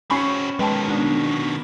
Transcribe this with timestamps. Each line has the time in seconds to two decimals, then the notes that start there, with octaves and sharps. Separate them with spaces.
0.10 C4 C#4 F#4 G#5 B5 C#6 C7
0.59 B2 D#3 G#3 B4 G5 A5
0.89 B3 D4